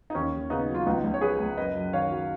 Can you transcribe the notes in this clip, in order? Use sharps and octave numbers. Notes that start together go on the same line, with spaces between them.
D#4
D#2 C#4
D#2
C#3 B3 D#4
F#3
F4
C#2 B3 D#4
C#2
C#5
F3 G#4 B4
C#2
F#1 B4 D#5
F#2
D#3 C#5 F5
F#3